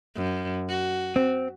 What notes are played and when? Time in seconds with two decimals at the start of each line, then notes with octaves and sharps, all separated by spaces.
0.16 F#2
0.69 F#4
1.16 C4